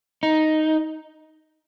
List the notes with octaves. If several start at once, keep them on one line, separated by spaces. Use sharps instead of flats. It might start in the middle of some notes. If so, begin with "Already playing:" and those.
D#4